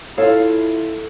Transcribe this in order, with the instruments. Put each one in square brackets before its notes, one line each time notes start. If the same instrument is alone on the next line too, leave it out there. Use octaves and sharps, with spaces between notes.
[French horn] E4 [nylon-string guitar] F4 F5 [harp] A4 [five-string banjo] C#5